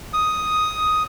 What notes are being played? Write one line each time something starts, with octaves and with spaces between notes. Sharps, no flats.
D#6